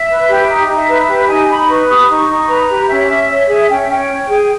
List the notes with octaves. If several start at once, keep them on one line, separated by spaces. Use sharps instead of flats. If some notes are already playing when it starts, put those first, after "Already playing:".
Already playing: E5
B4
G4
D#4
D#4
E5
B4
E5
G4
D#4 G#5
D#4 B5
B4 C#6
G4 D#6
D#4 C#6
D#4
B4 A#5
G4
C#4 E5
C#4
C#5
G#4
C#4 G5
E5
C#4 G5
C#5
G#4